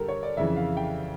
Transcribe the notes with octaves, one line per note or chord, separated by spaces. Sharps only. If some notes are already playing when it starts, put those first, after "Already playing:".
Already playing: G2 D3 G4 A4 A#4
C#5
D5
F2 C#3 E3 E5
F5
G5